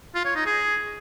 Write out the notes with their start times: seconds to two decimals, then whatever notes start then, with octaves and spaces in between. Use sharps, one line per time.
0.15 F4
0.25 C#5
0.36 D#4
0.46 G#4